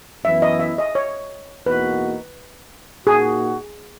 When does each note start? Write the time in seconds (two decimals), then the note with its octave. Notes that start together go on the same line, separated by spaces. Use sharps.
0.24 F#2 E3 B3 E4 E5
0.42 D#5
0.60 E5
0.78 D#5
0.95 C#5
1.66 E2 B2 A#3 D#4 F#4 B4
3.07 A#2 A#3 D#4 F#4 G#4